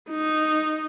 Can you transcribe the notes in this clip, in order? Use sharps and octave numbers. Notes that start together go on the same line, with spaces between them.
D#4